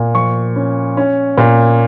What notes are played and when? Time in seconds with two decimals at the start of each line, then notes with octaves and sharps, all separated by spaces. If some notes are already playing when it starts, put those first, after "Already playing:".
Already playing: A#2
0.14 F3 C#6
0.56 C#4
0.97 C#4
1.38 A#2